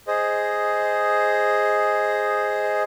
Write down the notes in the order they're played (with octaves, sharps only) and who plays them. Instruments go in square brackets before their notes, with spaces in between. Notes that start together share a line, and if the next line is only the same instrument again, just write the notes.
[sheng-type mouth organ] G#4 C5 D#5